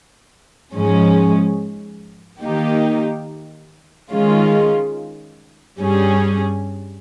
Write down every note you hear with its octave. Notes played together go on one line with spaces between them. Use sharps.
G#2 F3 G#3 C#4
D#3 A#3 D#4 G4
D#3 G#3 C#4 F4
G2 G3 C#4 G#4